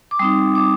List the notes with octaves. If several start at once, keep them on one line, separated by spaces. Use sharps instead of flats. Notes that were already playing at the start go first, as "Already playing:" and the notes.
D6
G3 C4 D#4 D#6
D6